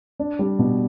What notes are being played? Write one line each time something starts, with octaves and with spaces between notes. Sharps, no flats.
D4
G3
B2